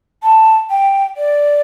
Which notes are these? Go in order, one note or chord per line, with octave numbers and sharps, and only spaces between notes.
A5
G5
D5